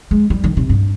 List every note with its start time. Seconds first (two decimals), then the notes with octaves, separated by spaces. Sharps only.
0.11 G#3
0.30 G3
0.44 D#3
0.57 C3
0.69 G2